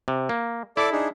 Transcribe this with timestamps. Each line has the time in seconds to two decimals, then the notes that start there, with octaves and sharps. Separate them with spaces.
0.08 C3
0.29 A#3
0.77 E4 A4 D5 D6
0.92 D4 D#4 G#4